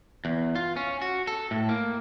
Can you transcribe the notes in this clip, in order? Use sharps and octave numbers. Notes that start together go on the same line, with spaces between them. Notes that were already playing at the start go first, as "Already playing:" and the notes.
E2
F4
C#4
F#4
A4
A2
A#3